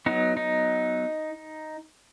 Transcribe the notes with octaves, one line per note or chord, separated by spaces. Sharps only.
F#3 B3 D#4
D#4